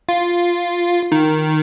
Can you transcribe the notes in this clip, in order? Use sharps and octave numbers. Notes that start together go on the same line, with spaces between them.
F4
D#3